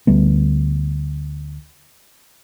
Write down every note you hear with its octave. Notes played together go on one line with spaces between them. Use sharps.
D2 G3 B3